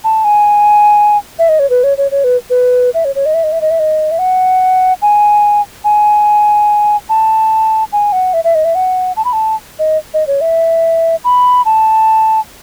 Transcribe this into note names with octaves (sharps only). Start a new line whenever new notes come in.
A5
G#5
E5
D#5
C#5
B4
C#5
C#5
C#5
B4
B4
E5
C#5
C#5
D#5
E5
D#5
E5
D#5
E5
D#5
E5
F#5
G#5
G#5
A5
G#5
F#5
E5
E5
D#5
E5
F#5
A5
B5
A5
D#5
D#5
C#5
E5
B5
A5